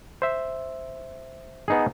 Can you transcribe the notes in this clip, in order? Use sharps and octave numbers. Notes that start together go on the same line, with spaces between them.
C5 E5
B3 D#4 G#4